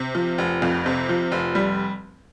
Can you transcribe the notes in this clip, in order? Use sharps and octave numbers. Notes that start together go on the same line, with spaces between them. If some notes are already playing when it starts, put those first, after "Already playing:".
Already playing: C3
F3
F1
F2
C3
F3
F1
G3